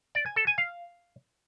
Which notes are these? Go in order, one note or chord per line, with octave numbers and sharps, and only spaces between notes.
D5
G#5
A4
G#5
F5